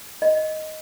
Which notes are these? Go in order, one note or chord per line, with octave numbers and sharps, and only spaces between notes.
D#5